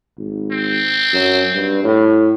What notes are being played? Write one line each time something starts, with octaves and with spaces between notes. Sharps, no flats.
G#1
C4
F#2
G2
A2